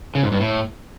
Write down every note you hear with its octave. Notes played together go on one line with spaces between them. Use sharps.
C#3
G#2
G2
A2